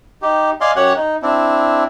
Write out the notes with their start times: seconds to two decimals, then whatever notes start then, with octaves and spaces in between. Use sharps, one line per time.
0.22 D#4 G4
0.61 D5 D#5 F5 G#5 C6
0.76 F#2 G4 C#5 F#5 F#6
0.96 D#4
1.23 C4 D4 E4